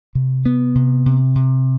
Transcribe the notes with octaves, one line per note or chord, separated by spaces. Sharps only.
C3
B3
C3
C3
C3